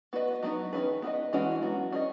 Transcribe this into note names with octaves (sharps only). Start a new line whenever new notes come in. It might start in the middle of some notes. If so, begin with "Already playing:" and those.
B3 F#4 B4 D#5
F#3 B3 D#4
D#3 A#3 C#4 G#4 B4
B3 F#4 B4 D#5
E3 G#3 C#4 F#4
F#3 B3 F#4
C#4 G#4 B4 D#5